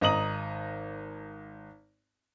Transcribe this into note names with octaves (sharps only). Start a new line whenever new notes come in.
G#1 D#5 A#5 D#6 F#7